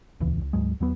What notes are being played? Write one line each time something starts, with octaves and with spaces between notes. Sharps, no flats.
D#1 C#2 E3
C#2
D2 G#2 F#3 G#3
D#2 F#3 B3